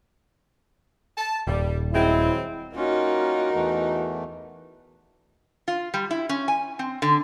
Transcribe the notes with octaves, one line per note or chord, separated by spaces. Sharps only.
A5
D#1 G3
F#3 G#3 C4 E4
A#3 C#4 D#4 F4 F#4 A#4
E2 E3 A3
F4
G3
E4
C#4
G#5
C4
D3